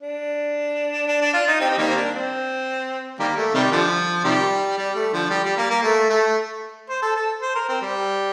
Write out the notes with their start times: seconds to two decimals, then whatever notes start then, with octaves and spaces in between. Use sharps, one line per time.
0.02 D4
1.08 D4
1.21 D4
1.34 F4
1.47 D#4
1.60 C4 D#4 G4
1.70 C4
1.78 D#3 G3 A#3
1.88 C4
1.96 D4
2.14 C4
3.19 D#3 G3 A#3
3.37 A3
3.54 C3 D#3 G3
3.72 D3 F3
4.24 C3 D#3 G3
4.78 G3
4.95 A3
5.13 D3 F3
5.30 G3
5.44 G3
5.57 A#3
5.70 A#3
5.83 A3
6.10 A3
6.89 C5
7.02 A4
7.16 A4
7.42 C5
7.55 A#4
7.68 C4
7.82 G3